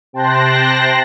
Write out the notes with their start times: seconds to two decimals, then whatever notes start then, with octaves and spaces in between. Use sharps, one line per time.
0.13 C3 G5 A5 C6 F#6 A#6